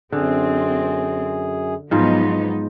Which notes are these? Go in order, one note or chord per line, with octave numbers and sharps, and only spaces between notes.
F#2 D3 C4 G#4
G#2 F3 F#3 B3 D#4